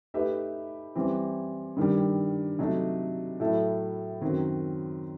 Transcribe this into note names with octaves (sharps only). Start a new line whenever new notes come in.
A3 D#4 G4 B4 E5
E3 G3 C4
G2 D#3 G3
C3 F#3 A3 D#4 A4
A2 F#3 A3 E4 A4
F#2 D#3 F#3 C4